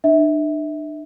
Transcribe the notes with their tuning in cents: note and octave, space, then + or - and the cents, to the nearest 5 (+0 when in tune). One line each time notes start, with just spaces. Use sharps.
D4 +40 E5 -25